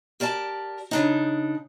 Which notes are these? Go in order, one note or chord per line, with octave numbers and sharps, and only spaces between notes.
G4 A#4 D5 E5 A5
C#3 D4 D#4